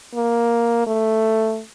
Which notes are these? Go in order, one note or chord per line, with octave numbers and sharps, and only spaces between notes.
A#3
A3